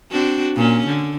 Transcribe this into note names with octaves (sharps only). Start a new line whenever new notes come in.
C4 D4 F#4
A#2 C#4
D3